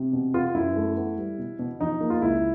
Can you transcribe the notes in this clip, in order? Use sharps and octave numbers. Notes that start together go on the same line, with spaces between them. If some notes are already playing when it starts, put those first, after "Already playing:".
Already playing: C3
B2
B3 F4
F#2 E4
A3
B3
G3
B2
B2
F3 D#4
A#3
F4
C#2 E4